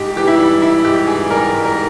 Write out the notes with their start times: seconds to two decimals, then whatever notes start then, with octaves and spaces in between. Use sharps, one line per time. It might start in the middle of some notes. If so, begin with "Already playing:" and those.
Already playing: G#2 G4
0.16 E3 G4
0.27 E4
0.39 G3
0.62 G#2 E4
0.85 G#2 G4
1.07 E3 G#4
1.30 G3 A#4
1.53 G#2
1.65 A#4